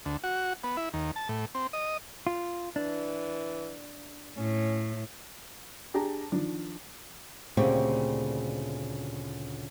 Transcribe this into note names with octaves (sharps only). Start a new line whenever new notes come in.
D2
F#4
B3
E4
D#2
A5
A2
C4
D#5
F4
E3 D4
A2 C#4
D4 G4 G#4 A5 A#5
D#3 F3 D4
D2 A#2 C#3 C4 G4 C#5